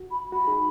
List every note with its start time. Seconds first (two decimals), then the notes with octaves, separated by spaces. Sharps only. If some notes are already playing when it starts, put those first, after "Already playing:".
Already playing: F#4
0.11 B5
0.32 F#4 B5
0.47 D#4 G#4